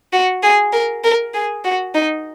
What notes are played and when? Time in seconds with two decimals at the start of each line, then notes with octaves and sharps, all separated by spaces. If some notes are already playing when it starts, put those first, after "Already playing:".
0.12 F#4
0.43 G#4
0.73 A#4
1.04 A#4
1.34 G#4
1.64 F#4
1.95 D#4